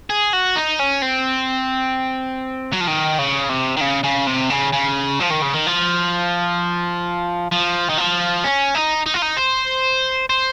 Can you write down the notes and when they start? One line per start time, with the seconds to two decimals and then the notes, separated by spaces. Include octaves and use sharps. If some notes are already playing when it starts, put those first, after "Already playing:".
0.10 G#4
0.33 F#4
0.56 D#4
0.80 C#4
1.02 C4
2.73 F#3
2.80 F3
2.87 D#3
3.19 C#3
3.50 C3
3.77 D#3
3.81 C#3
4.04 C#3
4.27 C3
4.50 C#3
4.73 C#3
5.20 F3
5.31 D#3
5.42 C#3
5.54 D#3
5.67 F3
7.51 F3
7.89 D#3
7.98 F3
8.44 C#4
8.75 D#4
9.06 D#4
9.14 F4
9.22 D#4
9.37 C5
10.29 C5